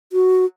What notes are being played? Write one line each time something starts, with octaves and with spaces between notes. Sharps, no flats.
F#4